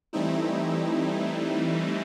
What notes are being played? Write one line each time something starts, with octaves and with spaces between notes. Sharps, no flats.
E3 G3 A3 C4 D#4 E4